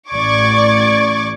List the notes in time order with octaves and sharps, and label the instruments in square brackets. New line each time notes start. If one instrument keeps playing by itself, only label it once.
[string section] A1 D5 C#6 D6 G#6